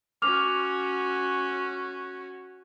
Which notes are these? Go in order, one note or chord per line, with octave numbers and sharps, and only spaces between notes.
C#4 F#4 D6 F6 F7